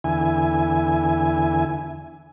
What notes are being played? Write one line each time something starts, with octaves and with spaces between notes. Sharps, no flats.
E2 D3 E4 G#5